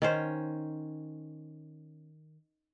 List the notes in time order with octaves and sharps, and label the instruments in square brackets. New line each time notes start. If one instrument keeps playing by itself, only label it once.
[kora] D#3 C#4 C5